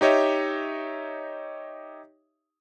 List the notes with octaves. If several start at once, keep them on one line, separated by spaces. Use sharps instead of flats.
D#4 G4 C#5 D#5 E5